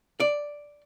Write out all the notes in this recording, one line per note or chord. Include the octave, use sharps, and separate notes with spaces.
D5